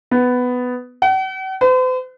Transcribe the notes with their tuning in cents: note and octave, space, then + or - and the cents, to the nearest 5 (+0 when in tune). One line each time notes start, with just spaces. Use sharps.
B3 +10
F#5 +45
C5 -45